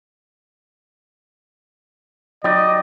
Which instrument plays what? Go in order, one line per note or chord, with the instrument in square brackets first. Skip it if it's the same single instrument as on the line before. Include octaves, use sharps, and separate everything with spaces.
[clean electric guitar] F#3 D#4 G4 [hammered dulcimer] D5 [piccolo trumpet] D#5